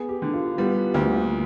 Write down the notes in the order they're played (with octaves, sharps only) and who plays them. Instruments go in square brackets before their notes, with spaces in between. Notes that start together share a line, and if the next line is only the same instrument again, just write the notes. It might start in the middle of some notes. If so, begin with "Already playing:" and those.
Already playing: [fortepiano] B3 [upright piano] G#4
[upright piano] G4
[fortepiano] D3
[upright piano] F4
[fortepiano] G3 [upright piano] B3
[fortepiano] D2 [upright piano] A#3